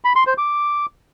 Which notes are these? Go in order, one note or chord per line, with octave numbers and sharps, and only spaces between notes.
B5
C6
C5
D6